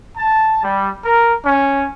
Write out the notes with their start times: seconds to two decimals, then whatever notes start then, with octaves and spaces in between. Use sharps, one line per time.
0.16 A5
0.64 G3
1.05 A#4
1.45 C#4